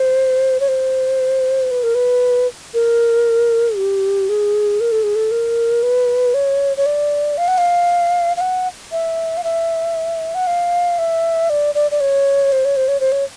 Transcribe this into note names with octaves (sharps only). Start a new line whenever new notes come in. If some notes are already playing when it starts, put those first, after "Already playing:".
Already playing: C5
C#5
C5
B4
A#4
B4
A#4
G4
G#4
A#4
A4
G#4
A4
A#4
B4
C#5
C#5
D5
F5
F#5
F5
F5
F#5
E5
F5
E5
F#5
F5
E5
D5
D5
D5
C#5
C5
C#5
C5
C#5
C5
C#5